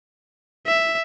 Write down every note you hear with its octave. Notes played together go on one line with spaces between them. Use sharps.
E5